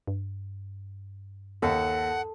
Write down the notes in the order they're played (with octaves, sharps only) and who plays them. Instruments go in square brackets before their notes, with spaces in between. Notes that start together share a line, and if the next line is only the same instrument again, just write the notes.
[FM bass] G2
[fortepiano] D#2 [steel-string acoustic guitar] A4 [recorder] F#5